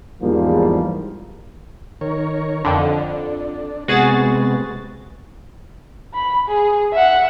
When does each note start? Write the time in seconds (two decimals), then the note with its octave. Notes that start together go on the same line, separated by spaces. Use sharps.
0.23 E2 G#2 F3 G3 A#3
2.01 D#3 A#4 C#5
2.65 F2 D3 D4
3.88 C3 G#3 B3 F#4 G#4 A6
6.15 B5
6.49 G#4
6.93 E5 F#5